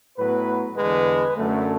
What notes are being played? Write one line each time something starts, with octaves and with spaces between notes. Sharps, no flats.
A2 F#3 B3 B4
E2 D3 G#3 B4
F#2 D3 A3